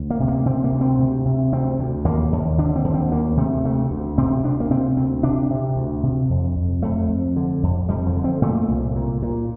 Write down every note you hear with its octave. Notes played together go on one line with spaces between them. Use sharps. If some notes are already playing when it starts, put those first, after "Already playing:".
Already playing: D2
A#3
C3
A#3
C3 C4
A#3
D2
C4
C3
C3
D2 C4
D2
D#2 A#3
D#2
D3 D4
C4
D#2
C4
D2 A#3
C3 A3
D2 A3
D2
C3 C4
D2 D4
A#3
C3 C4
D2 C4
C3 D4
C3
D2
C3
F2
F2
F2 A3
F2
D3
F2
F2 G3
F3
D3
C4
A#2 A3
C2
A#2
A#2